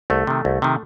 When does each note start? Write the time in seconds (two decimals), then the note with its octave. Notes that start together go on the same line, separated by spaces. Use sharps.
0.10 C2 A3
0.27 C3 D#3
0.45 C2
0.62 C3 D#3